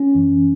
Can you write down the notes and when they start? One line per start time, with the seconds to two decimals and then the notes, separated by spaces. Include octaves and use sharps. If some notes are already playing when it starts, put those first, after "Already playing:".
Already playing: C#4
0.15 F#2 E3